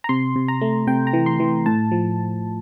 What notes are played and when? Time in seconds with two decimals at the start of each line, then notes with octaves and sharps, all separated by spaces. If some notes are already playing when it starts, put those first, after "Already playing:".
0.04 A#5
0.09 C3 C6
0.36 C3
0.48 A#5
0.61 A3
0.87 C3 G5
1.07 A#5
1.13 E3
1.26 C6
1.40 E3
1.66 A2 A5
1.92 F3